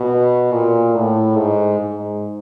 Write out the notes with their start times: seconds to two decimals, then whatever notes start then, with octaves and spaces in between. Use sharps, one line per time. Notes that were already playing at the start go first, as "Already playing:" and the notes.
Already playing: B2
0.52 A#2
0.94 A2
1.37 G#2
1.79 G#2